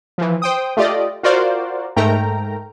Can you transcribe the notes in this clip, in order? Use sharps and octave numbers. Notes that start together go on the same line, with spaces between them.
E3 F3
C5 G5 D#6
A3 F4 G4 D5 D#5
F4 F#4 A#4 C5 D5 F5
G#2 A3 A#4 G5 A#5